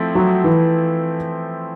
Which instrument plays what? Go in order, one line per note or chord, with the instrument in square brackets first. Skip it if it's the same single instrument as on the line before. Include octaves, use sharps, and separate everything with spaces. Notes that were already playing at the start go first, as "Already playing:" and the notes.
Already playing: [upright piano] F3 A3 C4 E4
[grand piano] F#3
E3